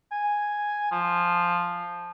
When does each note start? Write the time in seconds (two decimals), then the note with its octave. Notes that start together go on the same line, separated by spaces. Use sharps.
0.12 G#5
0.91 F3